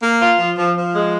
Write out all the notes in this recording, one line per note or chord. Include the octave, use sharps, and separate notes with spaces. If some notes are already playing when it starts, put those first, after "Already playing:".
A#3
F4
F3
F3
F3
G#3